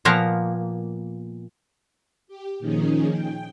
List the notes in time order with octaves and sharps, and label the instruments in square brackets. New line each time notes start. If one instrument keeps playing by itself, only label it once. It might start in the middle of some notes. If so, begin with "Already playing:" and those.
[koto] A#2 F3 A#3 B3 A#4
[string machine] G4
A#2 D#3 F3 C#4 D#4 G#4
G5